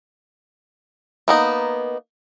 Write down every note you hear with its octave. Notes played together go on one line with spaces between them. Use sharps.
A#3 B3 D#4